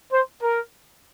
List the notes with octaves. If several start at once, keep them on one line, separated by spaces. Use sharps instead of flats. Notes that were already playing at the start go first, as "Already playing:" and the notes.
C5
A#4